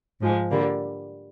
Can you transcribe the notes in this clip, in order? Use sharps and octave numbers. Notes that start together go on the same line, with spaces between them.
G#2 F3 G#3
D3 G3 A#3